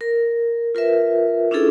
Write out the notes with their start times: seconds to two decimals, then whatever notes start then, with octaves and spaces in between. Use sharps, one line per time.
0.01 A#4
0.75 F4 A#4 B4 E5
1.51 C#4 D4 E4 F4 G#4 A4